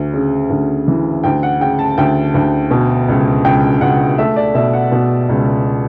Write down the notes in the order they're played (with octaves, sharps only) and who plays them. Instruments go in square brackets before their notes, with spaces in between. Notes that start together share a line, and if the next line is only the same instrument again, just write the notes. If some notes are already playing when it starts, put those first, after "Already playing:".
Already playing: [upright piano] D2
C#3
D2
E3
D2 G5
F#5
C#3 G5
A5
D2 G5
D2
B2
C#2
C#2 G5
C#2 F#5
A3 E5
D5
B2 E5
F#5
B2
C#2